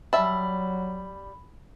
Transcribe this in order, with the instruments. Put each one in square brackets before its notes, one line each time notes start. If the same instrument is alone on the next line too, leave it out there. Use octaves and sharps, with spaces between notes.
[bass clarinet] F#3 [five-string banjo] G3 E5 A5 [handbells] B5